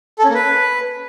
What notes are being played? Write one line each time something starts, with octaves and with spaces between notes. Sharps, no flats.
A4
C#4
A#3
B4